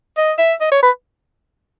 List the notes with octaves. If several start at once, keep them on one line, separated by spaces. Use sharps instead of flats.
D#5
E5
D#5
C#5
B4